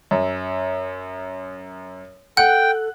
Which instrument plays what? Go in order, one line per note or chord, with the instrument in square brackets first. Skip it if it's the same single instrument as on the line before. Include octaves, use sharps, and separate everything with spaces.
[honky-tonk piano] F#2
[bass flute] A4 [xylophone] F#5 [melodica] G5 [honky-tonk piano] F#6